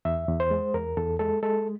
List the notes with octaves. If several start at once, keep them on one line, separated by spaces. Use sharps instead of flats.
E2 E5
E2
C5
G#3
E2 A#4
E2 A4
G#3 A4
G#3 A4